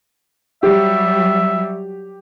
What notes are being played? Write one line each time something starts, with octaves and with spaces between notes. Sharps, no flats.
F#3 G3 G4 E5